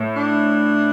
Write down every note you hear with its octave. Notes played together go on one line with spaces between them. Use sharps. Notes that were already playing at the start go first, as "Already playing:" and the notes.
Already playing: A2
D4